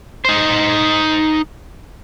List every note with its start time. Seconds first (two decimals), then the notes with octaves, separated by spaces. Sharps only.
0.25 D#4 C5